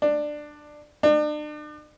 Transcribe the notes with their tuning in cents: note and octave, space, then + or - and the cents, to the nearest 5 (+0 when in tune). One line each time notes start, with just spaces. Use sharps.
D4 +15
D4 +40